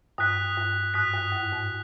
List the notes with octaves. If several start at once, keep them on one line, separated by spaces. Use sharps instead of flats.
G2 D#6 F#6 B6
G2
G#2 D#6 F#6 B6
G2
F#2
G#2